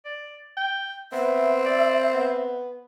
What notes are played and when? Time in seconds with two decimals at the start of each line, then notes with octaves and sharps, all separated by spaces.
0.05 D5
0.57 G5
1.13 B3 C4 E5
1.66 D5
2.14 B3